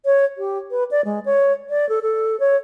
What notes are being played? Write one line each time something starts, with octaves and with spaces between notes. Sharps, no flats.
C#5
G4
B4
D5
G#3
C#5
D5
A4
A4
C#5